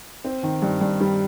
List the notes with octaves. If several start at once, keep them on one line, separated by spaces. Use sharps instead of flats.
C4
D#3
G2
G2
G3